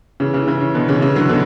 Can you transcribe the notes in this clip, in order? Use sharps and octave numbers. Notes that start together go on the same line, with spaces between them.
C#3 E3
C#3 E3
C#3 E3
C#3
B2 D3
C#3 E3
C#3 E3
D3 F#3
B2 D3